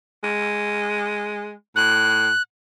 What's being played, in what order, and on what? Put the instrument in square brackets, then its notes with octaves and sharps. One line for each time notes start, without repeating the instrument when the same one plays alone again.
[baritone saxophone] G#3
[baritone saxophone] A2 [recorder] F#6